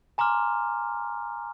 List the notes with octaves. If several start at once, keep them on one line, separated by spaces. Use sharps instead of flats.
G#5 A#5 C6 D6 F6